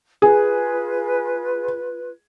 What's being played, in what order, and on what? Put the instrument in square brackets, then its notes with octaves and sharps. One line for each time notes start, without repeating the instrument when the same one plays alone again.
[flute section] F4 B4 [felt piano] G#4